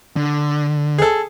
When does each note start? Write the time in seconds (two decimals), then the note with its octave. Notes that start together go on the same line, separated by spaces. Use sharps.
0.16 D3
0.98 G#4 A4